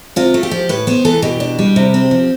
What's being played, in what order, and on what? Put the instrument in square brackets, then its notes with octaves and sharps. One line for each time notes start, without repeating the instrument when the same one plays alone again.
[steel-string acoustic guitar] C3 F4
A3
G4
F3
A2 B4
B3 C5
E3 A4
B2 G4
D4
G3
C3
C4
F3